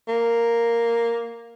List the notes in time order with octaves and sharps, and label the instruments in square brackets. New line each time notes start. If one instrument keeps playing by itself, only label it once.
[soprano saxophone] A#3